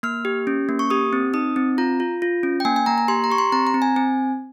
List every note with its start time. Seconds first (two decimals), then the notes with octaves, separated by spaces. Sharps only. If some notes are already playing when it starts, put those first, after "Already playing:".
0.03 A#3 F6
0.25 G4
0.47 C#4
0.69 A#3
0.79 C#6
0.90 G4 D#6
1.13 C4
1.34 D#4 D#6
1.56 C4
1.78 F4 A#5
2.00 F4
2.22 F4
2.43 C#4
2.60 G5
2.65 A#3 G#5
2.76 G#5
2.86 A#3 A#5
2.98 A#5
3.08 G4 C6
3.24 A#5
3.30 G4 C#6
3.38 C6
3.52 C4 A#5
3.67 A#5
3.74 C4
3.82 G#5
3.96 C4 G#5